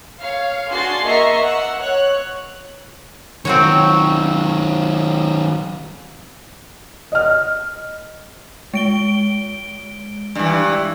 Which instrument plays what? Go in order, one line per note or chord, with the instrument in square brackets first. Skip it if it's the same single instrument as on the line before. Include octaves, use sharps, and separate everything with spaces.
[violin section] C#5 F5
D4 F#4 G#4 C6 A6 C7
A#3 D#5 E5 A#5 C#6 C7
F#5 E6
C#5 F#6
[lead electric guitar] D#3 F#3 [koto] C4 F#4 C#5
[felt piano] D#5 F6
[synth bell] G#3 D7 G7
[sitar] G2 E3